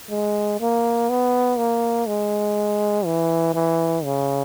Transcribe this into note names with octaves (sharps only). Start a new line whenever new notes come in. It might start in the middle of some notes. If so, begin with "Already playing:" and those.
G#3
A#3
B3
A#3
G#3
E3
E3
C#3